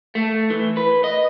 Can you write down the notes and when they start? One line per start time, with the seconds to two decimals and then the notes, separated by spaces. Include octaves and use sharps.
0.15 A3
0.50 E3
0.77 B4
1.04 D#5